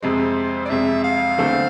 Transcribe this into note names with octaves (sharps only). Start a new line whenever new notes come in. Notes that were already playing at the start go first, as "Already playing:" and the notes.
F2 C3 G#3 C5
D5
F2 C3 G#3 E5
F5
E2 D3 A3 C4